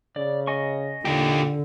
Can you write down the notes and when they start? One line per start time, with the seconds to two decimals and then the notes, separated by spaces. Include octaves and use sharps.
0.16 C#3 D5
0.47 D#5 G#5 C#6
1.05 A#2 D3 D#4 G4